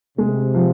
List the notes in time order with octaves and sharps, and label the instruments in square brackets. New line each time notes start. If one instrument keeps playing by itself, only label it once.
[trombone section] C3 [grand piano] G#3
[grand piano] F3